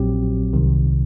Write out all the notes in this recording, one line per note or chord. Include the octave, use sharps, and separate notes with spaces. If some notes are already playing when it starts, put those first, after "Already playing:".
Already playing: A#1 A#2 F#3 C4 G4
C2 C3 D#3